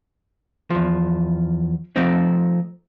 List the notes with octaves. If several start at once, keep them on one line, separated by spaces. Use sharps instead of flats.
E2 F3
F3 A3 C4 D#4